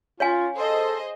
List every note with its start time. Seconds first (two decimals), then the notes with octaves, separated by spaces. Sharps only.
0.20 C#4 F4 C#5 F5 G#5
0.55 G#4 A4 C5 D#5